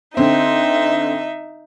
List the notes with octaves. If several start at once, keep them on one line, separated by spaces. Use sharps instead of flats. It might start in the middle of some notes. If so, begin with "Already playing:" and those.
D3 C4 D#4 E5